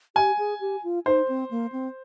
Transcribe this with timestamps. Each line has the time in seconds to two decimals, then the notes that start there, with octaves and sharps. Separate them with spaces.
0.16 G4 G#5
0.38 G#4
0.61 G4
0.84 F4
1.06 D#4 C5
1.28 C4
1.51 A#3
1.72 C4